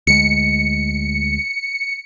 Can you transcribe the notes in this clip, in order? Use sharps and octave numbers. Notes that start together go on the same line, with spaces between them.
D2 G#3 C#7